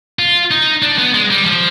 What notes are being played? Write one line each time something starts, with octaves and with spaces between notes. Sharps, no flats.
F4
D#4
D4
B3
G#3
G3
F3